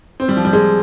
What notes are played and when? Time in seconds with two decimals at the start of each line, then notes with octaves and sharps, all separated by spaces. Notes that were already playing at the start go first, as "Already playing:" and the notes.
0.20 C4
0.29 G3
0.37 F3
0.45 G3
0.53 G#3